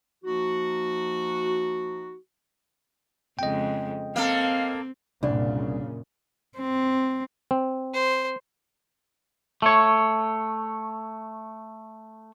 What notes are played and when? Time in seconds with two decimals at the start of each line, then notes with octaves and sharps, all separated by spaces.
0.24 F3 A#3 D#4 F#4
3.39 F2 C#3 G#3 D#5 G5
4.16 A#3 C4 A4 F5
5.23 C2 F#2 A#2 C#3 D4
6.58 C4
7.51 C4
7.94 C5
9.62 A3 C#5